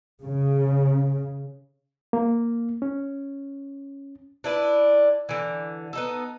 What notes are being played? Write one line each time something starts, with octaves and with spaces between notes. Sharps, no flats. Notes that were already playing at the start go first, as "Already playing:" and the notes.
C#3
A#3
C#4
D4 E4 B4
D3 E3
B3 D#4 A4